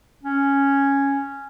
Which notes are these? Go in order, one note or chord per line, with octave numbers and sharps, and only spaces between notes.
C#4